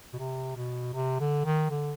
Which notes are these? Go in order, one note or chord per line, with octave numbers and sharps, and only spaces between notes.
B2
C3
B2
C3
D3
D#3
D3